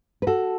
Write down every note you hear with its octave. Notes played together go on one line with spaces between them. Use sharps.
B4
F#4 A4